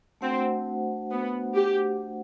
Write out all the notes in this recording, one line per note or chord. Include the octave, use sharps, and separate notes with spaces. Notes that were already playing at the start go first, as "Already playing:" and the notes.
A3 C4 D4 F#4 C5 F#5
B3
G4